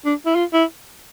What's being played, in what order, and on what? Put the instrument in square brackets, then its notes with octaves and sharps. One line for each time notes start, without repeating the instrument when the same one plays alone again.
[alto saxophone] D4
E4
F4
E4